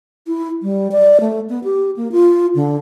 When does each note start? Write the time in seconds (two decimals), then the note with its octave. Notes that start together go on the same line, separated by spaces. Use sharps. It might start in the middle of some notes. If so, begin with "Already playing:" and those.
0.27 E4
0.63 G3
0.92 D5
1.21 A3
1.49 B3
1.64 G4
1.97 A#3
2.12 F4
2.55 D3